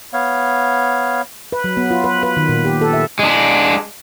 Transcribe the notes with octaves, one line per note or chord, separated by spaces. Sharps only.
B3 C#5 F5
B4
F#3
B3
F4
B4
B4
D#3
A#2
G4
A4
E5
G#3 D4